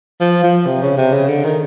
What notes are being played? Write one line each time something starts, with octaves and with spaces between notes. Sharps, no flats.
F3
F3
C3
C#3
C3
C#3
D3
D#3